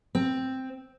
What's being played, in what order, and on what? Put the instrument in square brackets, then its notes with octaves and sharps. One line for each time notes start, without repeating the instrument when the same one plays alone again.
[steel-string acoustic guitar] C4